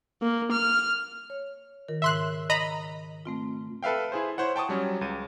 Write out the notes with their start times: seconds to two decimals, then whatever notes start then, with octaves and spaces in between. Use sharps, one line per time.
0.22 A#3
0.52 F6
1.30 C#5
1.88 D#3 F4 A#4
2.02 G#2 C#3 E5 C6 F#6
2.50 D#5 A#5 B5
3.25 A3 C4 F4
3.83 A4 B4 E5 F5 G5
4.12 E4 G#4 C5
4.38 E4 C5 C#5 F#5
4.56 G5 A5 C#6 D#6
4.69 F#3 G3 C#4
5.01 C#2 D#7